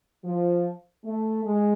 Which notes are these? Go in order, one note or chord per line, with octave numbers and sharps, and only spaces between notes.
F3
A3
G#3